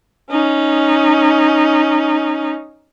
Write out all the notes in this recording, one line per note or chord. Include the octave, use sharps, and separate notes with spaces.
C#4 D#4